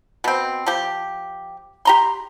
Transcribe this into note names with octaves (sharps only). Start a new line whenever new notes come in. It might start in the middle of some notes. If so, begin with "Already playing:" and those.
B2 C4
F3 G4
G4 A#5 C6